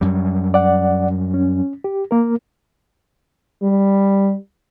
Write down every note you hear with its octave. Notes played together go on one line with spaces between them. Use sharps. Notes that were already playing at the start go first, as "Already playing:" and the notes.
F#2 G3
D5 F#5
C#4
G4
A#3 A#4
G3